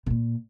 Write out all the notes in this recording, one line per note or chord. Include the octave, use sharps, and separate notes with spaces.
C3
A#2